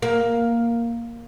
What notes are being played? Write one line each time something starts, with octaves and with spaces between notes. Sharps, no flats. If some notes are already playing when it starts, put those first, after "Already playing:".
A#3